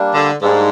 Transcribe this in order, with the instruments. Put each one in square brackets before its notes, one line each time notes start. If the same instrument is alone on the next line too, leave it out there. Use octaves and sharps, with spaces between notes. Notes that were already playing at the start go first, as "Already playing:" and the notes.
Already playing: [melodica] G3 A#3 D4
[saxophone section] D3
[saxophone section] G#2 [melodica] G3 A#3 D4